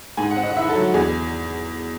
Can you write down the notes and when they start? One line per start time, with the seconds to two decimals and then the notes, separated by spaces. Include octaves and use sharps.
0.17 G#2 G#5
0.31 F#5
0.37 C4
0.43 D#5
0.50 F#5
0.56 E4 E5
0.69 A4
0.75 F#3
0.94 E2 G#4